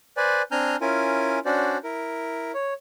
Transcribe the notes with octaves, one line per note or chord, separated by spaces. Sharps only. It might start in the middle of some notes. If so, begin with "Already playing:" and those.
B4 C5 D5 G#5
C4 D4 G#5 A#5 F6 G6
C#4 E4 F4 A#4 G#5
C#4 D4 F#4 C5 D5
E4 A#4
C#5